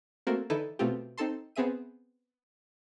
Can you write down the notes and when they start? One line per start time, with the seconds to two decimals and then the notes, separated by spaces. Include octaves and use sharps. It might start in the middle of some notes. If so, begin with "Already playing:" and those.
0.27 A3 A#3 C4 F#4 A4 A#4
0.50 D3 E3 D#4 E4 A4 B4
0.79 B2 A3 B3 C4 F4 G4
1.18 C4 D#4 A4 A5 C6
1.56 B3 C4 G#4 E5 D#7